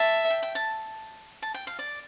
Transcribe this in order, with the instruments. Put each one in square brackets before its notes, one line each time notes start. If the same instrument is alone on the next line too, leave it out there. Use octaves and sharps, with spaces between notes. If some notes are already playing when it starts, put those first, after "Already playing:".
Already playing: [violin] E5 [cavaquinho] A5
[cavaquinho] G5
G5
A5
A5
G5
F5
D5